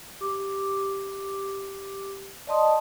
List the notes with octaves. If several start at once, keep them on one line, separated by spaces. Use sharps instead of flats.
G4 D6
D5 D#5 A5 C6 D#6